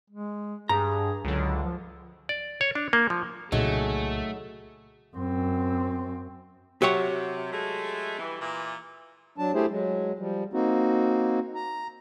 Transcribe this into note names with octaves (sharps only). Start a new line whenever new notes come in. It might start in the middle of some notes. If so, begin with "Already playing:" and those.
G#3
G2 G#4 A#5
C#2 D3 F#3
F3
D5
C#5
D4
A#3
F3
C2 A#2 C#3 F#3 A3 D#4 G#4
F#2 C4
C3 F#3 G4 C#5 E5 F#5
G#3 A3
G2 E3
A#2 E3
F#3 D4 A5
A3 E4 G4 G#4 C5
F#3 G#3
F3 G3
A#3 C4 D#4 F#4
A#5